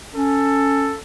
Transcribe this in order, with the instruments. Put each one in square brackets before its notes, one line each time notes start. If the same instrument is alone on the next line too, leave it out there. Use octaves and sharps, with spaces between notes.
[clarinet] C#4 [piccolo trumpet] A4